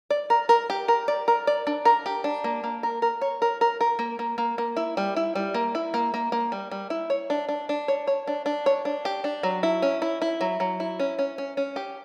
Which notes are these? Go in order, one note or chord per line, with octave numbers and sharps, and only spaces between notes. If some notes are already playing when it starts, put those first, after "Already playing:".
D5
A#4
A#4
G4
A#4
D5
A#4
D5
D4
A#4
G4
D4
A#3
A#3
A#4
A#4
C#5
A#4
A#4
A#4
A#3
A#3
A#3
A#3
E4
G3
E4
G3
A#3
E4
A#3
A#3
A#3
G3
G3
E4
C#5
D4
D4
D4
C#5
C#5
D4
D4
C#5
D4
G4
D4
F#3
E4
C#4
E4
E4
F#3
F#3
E4
C#4
C#4
C#4
C#4
G4